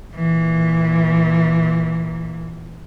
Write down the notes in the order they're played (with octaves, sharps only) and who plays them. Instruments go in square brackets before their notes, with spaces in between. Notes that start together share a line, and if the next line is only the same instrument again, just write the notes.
[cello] A#2 E3